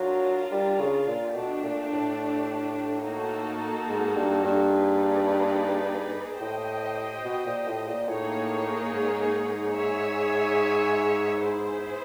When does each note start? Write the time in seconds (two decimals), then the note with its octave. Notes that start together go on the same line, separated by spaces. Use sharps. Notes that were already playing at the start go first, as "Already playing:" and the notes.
Already playing: F#3 D4 F4 A#4
0.52 G3
0.80 C#3
1.08 A#2
1.36 B2 A3 D4 G4
1.64 A#2
1.92 A2
3.04 A#3 D#4 F#4 A4
3.88 G#2
4.16 G2
4.44 G2
4.72 A#3 D#4 G#4 B4 D5
6.40 A2 G4 C5 D#5 G5
7.25 B2
7.46 A#2
7.67 A2
7.88 A#2
8.08 A2 A#3 D#4 G#4 C#5
8.93 G#2
9.77 G#4 C#5 E5 G#5
11.45 B3 E4 G#4 C5